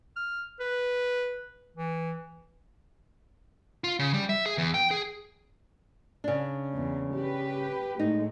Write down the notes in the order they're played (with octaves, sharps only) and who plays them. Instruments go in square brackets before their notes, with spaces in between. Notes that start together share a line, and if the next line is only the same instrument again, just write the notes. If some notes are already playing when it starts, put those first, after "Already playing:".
[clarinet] F6
B4
E3
[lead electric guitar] F4
C#3
G3
E5
G#4
E2
G5
G#4
[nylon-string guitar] C#3 D4
[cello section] E2
G4 B4
[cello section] A2 G#3 A3 [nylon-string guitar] D#4